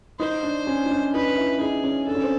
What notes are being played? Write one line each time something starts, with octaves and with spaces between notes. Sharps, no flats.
D#4 C5
D4
C#4
D#4
D4
D#4 B4
E4
D#4 G#4
C#4
D4 A4
C#4
C4